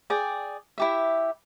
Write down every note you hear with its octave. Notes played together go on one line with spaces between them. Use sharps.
G#4 D5 G5
E4 G4 E5